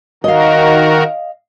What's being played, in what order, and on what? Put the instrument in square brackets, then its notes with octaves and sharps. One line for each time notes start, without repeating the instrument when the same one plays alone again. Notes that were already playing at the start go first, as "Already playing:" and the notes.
[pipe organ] D#3 F#4 A#4 [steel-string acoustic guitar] D#5 F5